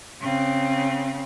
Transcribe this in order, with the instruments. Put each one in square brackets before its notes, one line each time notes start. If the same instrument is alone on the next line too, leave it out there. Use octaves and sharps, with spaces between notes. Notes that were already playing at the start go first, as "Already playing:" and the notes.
[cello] C#3 C4